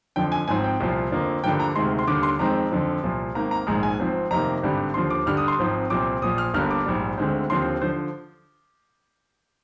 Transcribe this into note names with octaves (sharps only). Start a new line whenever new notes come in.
F2 D3 F3 G5
G#5
G#1 G#2 F3 C4 G#5
G5
C2 A#2 F3
F2 D3 F3 A#3
G2 D3 F3 A#3 G5
A#5
D2 C3 D#3 G#3 C6
C6
D#2 D3 G3 D6
C6
F2 D#3 G#3 C4 A#5
F2 D3 F3
C2 A#2 F3
G#1 G#2 D#3 A#3 A#5
A#5
A#1 G#2 D#3 G#3 A#5
G#5
G#1 G#2 F3 C4
F2 C3 D#3 A#3 A#5
G#1 G2 D3 G3
D#2 D3 F3 C6
D6
G2 D3 G3 F6
D#6
C6
G#1 G#2 F3 C4
C2 A#2 F3 C4 D6
A#1 A#2 F3 D#6
F6
G1 G2 D3 G3 A#3 F6
D6
A#1 G#2 G3
D2 D3 G#3 C4
D#2 D3 F3 C4 C6
D3 F3 C5